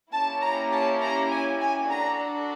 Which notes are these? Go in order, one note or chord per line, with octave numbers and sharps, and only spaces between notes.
A#3 C#4 E4 G4 A5
A#5
A5
A#5
G#5
G#5
D4 F#4 A4 A#5